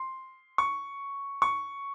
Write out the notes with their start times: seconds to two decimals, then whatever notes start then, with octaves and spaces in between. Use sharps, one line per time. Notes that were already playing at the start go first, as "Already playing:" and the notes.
Already playing: C6
0.58 C#6
1.42 C#6